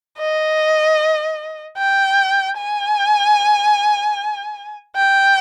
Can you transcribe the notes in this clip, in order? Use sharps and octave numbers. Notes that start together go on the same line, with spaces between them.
D#5
G5
G#5
G5